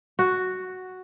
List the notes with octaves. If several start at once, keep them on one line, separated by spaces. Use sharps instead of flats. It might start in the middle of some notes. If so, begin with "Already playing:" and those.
F#4